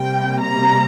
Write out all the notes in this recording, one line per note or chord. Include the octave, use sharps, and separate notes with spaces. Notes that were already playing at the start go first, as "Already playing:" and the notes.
Already playing: C3 G3 A#3 G5
A#5